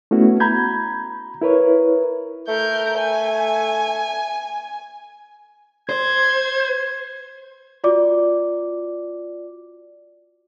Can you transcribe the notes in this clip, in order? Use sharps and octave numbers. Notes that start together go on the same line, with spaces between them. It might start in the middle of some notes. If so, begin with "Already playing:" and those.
A3 B3 C#4 E4 F#4
A#5 B5 G6 G#6
E4 A#4 B4 C#5
A3 A#4 G6
G#5
C5 G#6
F4 F#4 D5 D6